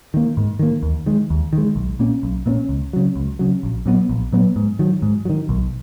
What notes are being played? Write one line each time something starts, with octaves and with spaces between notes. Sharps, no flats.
D#3 A#3
G#2
D#3 A#3
D#2
D#3 G#3
D#2
D#3
G#3
B1
A#2 A#3 C#4
B1
A#2 A#3 C#4
C#2
C#3 F#3
C#2
C#3 F#3
A#1
A#2 F#3 B3
A#1
A#2 F#3 B3
G#2
D#3 F#3
G#2
F#3
D#3
B1